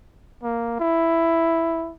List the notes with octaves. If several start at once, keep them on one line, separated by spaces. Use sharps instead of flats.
A#3
E4